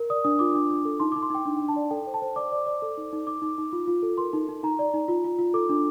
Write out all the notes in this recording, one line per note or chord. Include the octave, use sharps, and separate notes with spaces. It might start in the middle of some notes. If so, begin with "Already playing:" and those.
Already playing: A#4
D5 D#6
D4 D#6
F4 D6
D4
D4
A4
D#4 C6
D#4 D6
C6
D#4 G5
D4
D4 G5
A5
D5
A4 G5
C5
A5
C5
D5 D6
D5
D5
A4
D#4
D#4
D#4 D6
D#4
D#4
F4
F4
A4
A#4 C6
D#4
D#4
D#4 A#5
D5
D#4
F4
F4
F4
A4 D6
D4